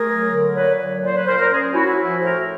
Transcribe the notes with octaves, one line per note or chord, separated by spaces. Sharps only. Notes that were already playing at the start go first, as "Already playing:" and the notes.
Already playing: A3 G#4 A#4
F#3
D3
A#2 B4 C#5
F#3
A#2 C5 D5
B4 C#5
A#2 A#4 C5
A#4 C5
C#4 G#4 A#4
C#4 E4 F#4
E4 F#4
F3 E4 F#4
A2 A#4 C5